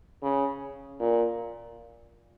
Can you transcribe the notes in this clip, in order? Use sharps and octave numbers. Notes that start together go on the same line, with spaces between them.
C#3
A#2